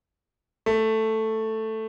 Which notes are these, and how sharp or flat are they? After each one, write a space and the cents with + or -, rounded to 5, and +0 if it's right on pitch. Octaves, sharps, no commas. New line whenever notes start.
A3 +5